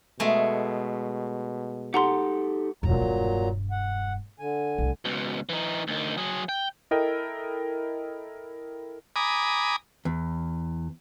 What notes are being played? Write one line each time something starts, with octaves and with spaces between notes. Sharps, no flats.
B2 G#3 A3
D#4 G4 A4 F#5 A#5 C6
E1 G2 A#2 F#3 A#5
E1 G2
F#5
D3 G#5
C2 A2
C#2 B2
E3 D#4
D2 D#3
F#3 G#4
G5
E4 A4 A#4 D#5 G5
G#5 A#5 B5 D6 D#6
E2